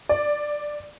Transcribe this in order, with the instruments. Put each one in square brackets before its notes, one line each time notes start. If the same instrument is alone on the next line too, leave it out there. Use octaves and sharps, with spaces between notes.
[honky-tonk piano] D5